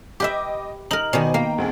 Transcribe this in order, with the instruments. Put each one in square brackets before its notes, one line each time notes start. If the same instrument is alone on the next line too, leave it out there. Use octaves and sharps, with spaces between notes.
[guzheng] G4 B4 E5 [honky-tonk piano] D#5 G5 D6
[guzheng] D#4 A#4 [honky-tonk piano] F#7
[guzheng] B2 D#3 [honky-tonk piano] C5 D5 G#5
[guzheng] A#3 [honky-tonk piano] G5 A#5
[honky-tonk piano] D2 C4 G#4